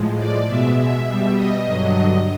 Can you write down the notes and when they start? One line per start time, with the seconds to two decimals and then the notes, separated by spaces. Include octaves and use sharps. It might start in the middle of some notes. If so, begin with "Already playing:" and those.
Already playing: A2 F3 G#3
0.18 D5
0.48 B2 G#3 E5
1.06 B2 G3
1.36 D#5
1.67 G2 D3 F#3